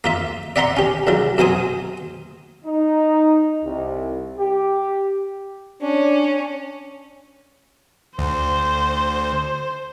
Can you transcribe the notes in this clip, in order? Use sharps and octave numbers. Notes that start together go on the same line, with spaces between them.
A#3 F4 E5
D5 E5 F#5 A#5 C6
C#4 G4
C2 C#3 F#3
F#2 F#3 C5 G#5 D#6
D#4
C2
G4
C#4 D4
D2 C5